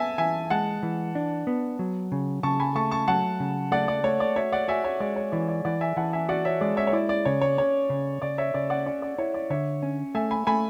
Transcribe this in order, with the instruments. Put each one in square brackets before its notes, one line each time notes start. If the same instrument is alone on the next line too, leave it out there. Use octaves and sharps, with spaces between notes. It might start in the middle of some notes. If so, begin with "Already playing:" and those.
Already playing: [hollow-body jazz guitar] B3 [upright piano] E5 G#5 A5
[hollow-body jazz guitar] E3 [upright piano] E5 G#5
[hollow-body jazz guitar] G#3 [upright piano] F#5 A5
[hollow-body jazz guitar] E3
D4
B3
F#3
C#3
[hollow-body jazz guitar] C#3 [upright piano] A5 C#6
[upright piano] G#5 B5
[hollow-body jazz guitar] A3 [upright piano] A5 C#6
[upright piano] A5 C#6
[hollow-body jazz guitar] F#3 [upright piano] F#5 A5
[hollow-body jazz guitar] C#3
[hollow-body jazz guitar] A3 [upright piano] D5 F#5
[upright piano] D5
[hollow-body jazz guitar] A3 [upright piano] C#5
[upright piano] D5
[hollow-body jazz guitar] F#4 [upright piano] C#5 E5
[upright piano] D5 F#5
[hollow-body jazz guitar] F#4 [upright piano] E5 G#5
[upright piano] C#5 E5
[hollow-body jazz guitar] G#3 [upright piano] D5
[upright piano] C#5
[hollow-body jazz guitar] E3 [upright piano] D5
[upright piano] D5
[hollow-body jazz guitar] E3 [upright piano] D5 F#5
[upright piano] E5 G#5
[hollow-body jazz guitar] E3 [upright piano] F#5 A5
[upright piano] E5 G#5
[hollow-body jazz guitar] F#4 [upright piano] D5 F#5
[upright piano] C#5 E5
[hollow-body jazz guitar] G#3 [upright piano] D5
[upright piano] C#5 E5
C#5
[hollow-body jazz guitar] E4 [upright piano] D5
[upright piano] D5
[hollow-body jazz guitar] C#3 [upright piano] C#5
[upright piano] C#5
[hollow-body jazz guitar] C#4 [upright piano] C#5
[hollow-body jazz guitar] C#3
[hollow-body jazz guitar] C#3 [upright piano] D5
[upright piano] C#5 E5
[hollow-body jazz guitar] C#3 [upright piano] D5
[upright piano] D5 F#5
[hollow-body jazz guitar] C#4 [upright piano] D5
[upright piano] D5
[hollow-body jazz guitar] E4 [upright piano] C#5
[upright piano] D5
[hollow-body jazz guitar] D3 [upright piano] C#5 E5
[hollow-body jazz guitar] C#4
[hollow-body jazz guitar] A3 [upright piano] E5 G#5
[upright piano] G#5 B5
[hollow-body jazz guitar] A3 [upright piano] G#5 B5